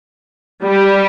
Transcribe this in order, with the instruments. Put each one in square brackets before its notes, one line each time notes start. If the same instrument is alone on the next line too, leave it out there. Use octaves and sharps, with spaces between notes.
[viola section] G3